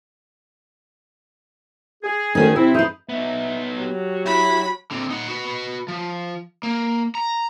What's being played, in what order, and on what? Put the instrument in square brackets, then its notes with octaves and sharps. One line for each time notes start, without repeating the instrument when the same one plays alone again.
[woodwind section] G#4
[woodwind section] D2 D#3 G#4 [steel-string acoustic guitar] A3 C#4 D#4
[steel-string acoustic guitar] C3 [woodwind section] C4 E4
[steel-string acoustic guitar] D#4 B4 [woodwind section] E4 G#4 C5
[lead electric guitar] B3 D#4 [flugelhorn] E5
[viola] F#3 [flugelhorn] G4
[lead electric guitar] E4 [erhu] B5
[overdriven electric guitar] D3 C4
D#4 F#5
F#4 B4
F3
A#3
A#5